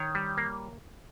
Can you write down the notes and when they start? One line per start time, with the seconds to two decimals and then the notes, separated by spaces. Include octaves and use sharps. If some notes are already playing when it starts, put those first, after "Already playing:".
Already playing: D#3 C#5
0.15 G3
0.37 A#3